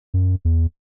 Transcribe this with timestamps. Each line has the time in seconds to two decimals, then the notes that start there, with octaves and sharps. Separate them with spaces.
0.14 F#2
0.45 E2